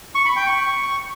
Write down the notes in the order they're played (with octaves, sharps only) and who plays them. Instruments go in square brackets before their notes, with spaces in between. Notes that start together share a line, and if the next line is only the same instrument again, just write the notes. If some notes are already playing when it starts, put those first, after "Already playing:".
[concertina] C#6
B5
G5
C#6